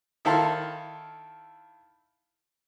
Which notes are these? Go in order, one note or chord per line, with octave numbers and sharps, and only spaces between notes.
D#3 E4 A4 F5 A5 C6